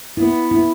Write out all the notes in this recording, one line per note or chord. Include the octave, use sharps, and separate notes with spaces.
B3 E4
E4